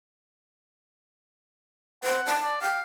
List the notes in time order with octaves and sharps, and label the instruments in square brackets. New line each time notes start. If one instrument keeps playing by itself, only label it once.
[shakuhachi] C5 [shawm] F#5
[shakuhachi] A5
[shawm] D5
[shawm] F5 [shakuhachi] G5